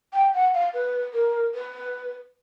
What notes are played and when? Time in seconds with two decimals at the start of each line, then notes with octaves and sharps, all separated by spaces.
0.13 G5
0.34 F#5
0.54 F5
0.74 B4
1.13 A#4
1.54 B4